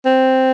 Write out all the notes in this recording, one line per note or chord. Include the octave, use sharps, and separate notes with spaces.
C4